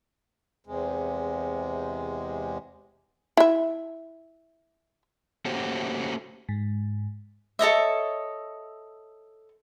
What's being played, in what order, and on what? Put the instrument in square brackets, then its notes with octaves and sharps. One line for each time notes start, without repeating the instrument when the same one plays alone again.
[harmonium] E2 C3 G#3
[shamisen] E4 E5
[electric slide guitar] A3 A#3 C#4 F#4 G4 C5
[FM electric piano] G#2
[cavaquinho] A4 C#5 D#5 E5